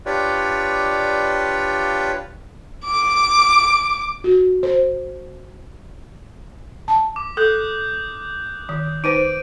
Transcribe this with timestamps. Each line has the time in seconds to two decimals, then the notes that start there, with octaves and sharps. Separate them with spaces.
0.06 D4 F4 G4 B4 C#5 D5
2.85 D6
4.24 F#4
4.63 C5
6.88 A5
7.16 D6
7.37 A4 D#6 F#6 G6
8.69 D#3
9.04 D#4 B4 C5 D7 D#7